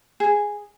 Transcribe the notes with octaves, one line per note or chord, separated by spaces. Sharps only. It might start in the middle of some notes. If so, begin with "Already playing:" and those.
G#4